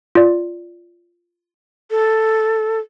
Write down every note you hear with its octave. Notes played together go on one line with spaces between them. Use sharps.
F4 D5
A4